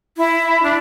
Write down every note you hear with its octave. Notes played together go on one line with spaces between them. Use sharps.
E4
D4